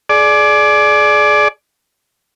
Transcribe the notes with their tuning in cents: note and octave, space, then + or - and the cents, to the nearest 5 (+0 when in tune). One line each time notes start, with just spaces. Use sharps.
G#4 +30 D5 +0